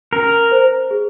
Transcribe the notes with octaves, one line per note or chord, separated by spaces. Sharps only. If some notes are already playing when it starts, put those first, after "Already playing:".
C#4 A#4
C5
G#4